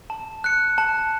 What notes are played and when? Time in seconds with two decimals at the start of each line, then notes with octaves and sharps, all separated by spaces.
0.10 A5
0.44 F#6 C#7
0.78 A5